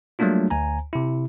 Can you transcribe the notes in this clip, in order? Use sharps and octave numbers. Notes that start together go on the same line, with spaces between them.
F#3 G3 A3 A#3 D4 F4
D2 G#5 A#5
C3 E4